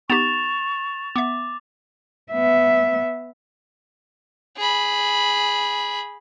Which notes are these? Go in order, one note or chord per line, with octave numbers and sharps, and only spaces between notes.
B3 D#4 G4 C#6 A6 E7 F7
B3 E5 D6
B3 E5
G#4 B5